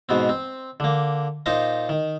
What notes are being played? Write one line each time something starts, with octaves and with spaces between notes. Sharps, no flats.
G#2 B2 B3 C4
C4
D3 A#3
A#2 D#4 C5 F5 A#5
D#3